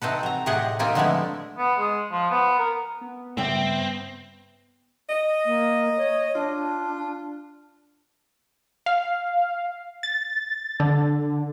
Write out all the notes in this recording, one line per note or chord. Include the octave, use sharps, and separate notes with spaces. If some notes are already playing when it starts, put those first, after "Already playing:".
C3 C4 D#4 A4 B4
F#3 A#5
A2 C3 G4 G#4 D#5 F#5
A#3 C4 D#4 F4 G4 G#5
D3 F3 G#3 A3 B3 E4
B3
G#3
F3
B3
A#4
B3
G2 C#3 G3 C4 E5 G5
D#5
A#3
C#5
D4 F4
F5
A6
D3